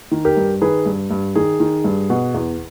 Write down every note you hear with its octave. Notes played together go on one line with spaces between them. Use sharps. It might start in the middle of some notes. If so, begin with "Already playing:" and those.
D#3
G4 A#4
G2
D#3 G#4 B4
G2
G2
D#3 G#4
D#3
G2
B2
E2